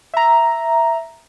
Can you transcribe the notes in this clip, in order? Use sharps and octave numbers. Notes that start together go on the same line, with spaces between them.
E5 A#5